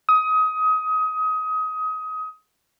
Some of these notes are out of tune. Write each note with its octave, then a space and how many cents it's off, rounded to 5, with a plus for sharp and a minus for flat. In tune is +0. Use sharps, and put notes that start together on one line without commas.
D#6 +25